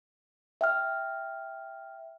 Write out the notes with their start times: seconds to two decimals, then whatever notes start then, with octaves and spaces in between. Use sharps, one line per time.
0.61 E5 G5 F6